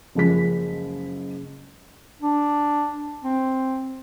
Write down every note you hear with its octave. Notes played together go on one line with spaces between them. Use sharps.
F#1 F3 G#3 B6
D4
C4